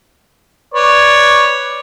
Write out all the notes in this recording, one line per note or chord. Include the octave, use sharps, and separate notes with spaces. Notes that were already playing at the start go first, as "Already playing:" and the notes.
B4 C#5 D5